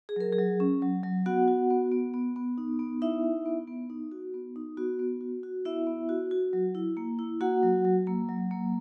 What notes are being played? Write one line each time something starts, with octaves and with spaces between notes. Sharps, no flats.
G#4
F#3 A#4
G#4
F#3
C#4
F#3
F#3
B3 F#4 F#5
F#4
B3
B3
B3
B3
D#4
B3
D#4 E4 E5
D#4
B3
B3
D#4
F#4
B3
D#4
B3 F#4
B3
F#4
F#4
B3 E4 E5
B3
F#4
F#4
F#3
E4
A#3
E4
A#3 F#4 F#5
F#3
F#3
A#3
F#3
A#3